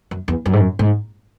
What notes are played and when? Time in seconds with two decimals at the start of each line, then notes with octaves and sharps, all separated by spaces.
0.11 F#2
0.28 E2
0.46 F#2
0.53 G#2
0.60 F#2
0.79 G#2